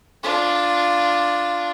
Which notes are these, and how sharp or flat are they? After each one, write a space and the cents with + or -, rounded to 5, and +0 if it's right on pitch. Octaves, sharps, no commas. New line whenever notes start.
D4 +0 F4 +0